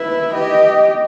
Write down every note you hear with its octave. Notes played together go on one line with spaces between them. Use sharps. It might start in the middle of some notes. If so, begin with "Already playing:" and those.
Already playing: E4 B4
G4 D#5